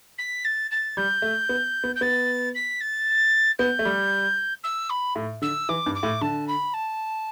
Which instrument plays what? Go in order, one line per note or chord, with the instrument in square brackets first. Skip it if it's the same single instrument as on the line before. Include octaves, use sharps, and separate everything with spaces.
[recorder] B6
A6
A6
[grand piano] G3 [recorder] G6
[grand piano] A3
B3
B3
[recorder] G6
[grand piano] B3 [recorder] A6
[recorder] B6
A6
[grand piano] B3 [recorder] G6
[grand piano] A3
G3
[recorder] E6
B5
[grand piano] A2
[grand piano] D3 [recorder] E6
[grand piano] E3 [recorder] D6
[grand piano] G2
[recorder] D6
[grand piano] A2
[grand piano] D3 [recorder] A5
[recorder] B5
A5